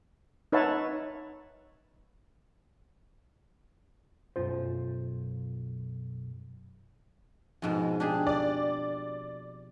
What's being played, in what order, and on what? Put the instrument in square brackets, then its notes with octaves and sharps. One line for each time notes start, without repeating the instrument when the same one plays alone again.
[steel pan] D#4 B4 C#5 E5 F#5 A5
[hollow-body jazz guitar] B1 F#2 F4 C5
[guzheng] F2 G#2 B2
D4 G4 G#4
[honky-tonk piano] D5